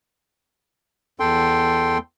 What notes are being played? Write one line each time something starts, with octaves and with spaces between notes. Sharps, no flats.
E2 A4 G5 C6